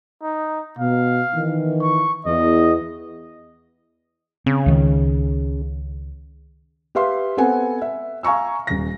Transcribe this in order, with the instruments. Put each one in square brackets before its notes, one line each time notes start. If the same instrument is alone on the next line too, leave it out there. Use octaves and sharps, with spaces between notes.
[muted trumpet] D#4
[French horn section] B2 [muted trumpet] F5
[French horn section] D#3 E3
[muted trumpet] C#6
[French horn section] E2 [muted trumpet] D#5
[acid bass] C#3 [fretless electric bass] C4
[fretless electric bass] C#2 D#3
[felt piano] G4 B4 E5 F5 C6
B3 C4 A4 F#5 G#5
E5
F5 G#5 A#5 C#6 E6
D#1 A#6